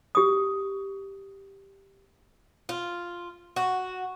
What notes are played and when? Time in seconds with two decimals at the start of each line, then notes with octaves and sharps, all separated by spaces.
0.15 G4 D#6
2.69 F4
3.56 F#4